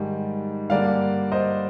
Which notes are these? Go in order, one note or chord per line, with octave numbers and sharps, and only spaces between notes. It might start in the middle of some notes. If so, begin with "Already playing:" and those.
Already playing: G#2 D#3 G3
G2 D3 G3 A#3 D5 F5
C5 D#5